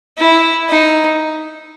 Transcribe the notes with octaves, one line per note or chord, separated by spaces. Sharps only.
E4
D#4